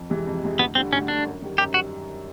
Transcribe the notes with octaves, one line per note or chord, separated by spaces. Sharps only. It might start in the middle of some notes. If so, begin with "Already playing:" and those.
Already playing: F2
C3 E3 G#3
F2
C3 E3 G#3
D2 B3
D3 G3 C4
D2 C#4
D3 G3 D4
F#2
D#3 G3
F#2 G4
G3 F#4